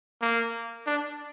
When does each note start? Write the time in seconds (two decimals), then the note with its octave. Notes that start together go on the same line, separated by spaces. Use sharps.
0.21 A#3
0.87 D4